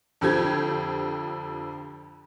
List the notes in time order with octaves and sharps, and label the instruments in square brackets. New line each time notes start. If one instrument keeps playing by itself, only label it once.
[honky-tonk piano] F2 D3 F3 G4 G6 G#6